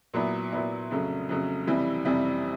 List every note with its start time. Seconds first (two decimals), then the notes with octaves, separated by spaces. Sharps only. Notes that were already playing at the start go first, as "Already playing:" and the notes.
0.14 A#2 F#3 B3 E4
0.52 A#2 F#3 B3 E4
0.90 F2 C#3 F#3 A3
1.29 F2 C#3 F#3 A3
1.67 F2 C3 E3 G3
2.05 F2 C3 E3 G3